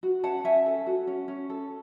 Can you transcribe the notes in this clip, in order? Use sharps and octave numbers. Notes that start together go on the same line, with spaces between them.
F#4
C#4 F#5 A5
C#4 E5 G#5
A4
F#4
C#4
C#4
A4